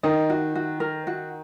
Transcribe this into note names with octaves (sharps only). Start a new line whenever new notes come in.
D#3 D#5
F#4
F#4
A#4
F#4